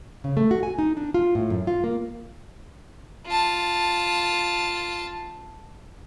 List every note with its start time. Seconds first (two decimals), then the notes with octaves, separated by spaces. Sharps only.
0.24 C#3
0.37 A3
0.51 F#4
0.63 G#5
0.79 D#4
0.97 D4
1.14 F4
1.35 A2
1.50 F#2
1.67 F4
1.84 A#3
3.27 F4 A5